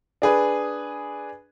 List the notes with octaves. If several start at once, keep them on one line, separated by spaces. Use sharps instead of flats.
D4 G#4 B4